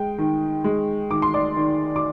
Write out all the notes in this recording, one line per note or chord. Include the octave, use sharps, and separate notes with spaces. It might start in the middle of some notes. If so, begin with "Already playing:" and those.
Already playing: G#3 G5
D#3
G#3
D#3 D6
C6
D5 D6
D#3
D6